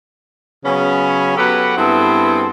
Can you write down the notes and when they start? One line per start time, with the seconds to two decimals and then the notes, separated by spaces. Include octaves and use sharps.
0.65 C#3 F#3 B3 C#4
1.37 F#3 B3 G4 A4 B4 F#5
1.77 G2 B3 C4 E4 G#4 A4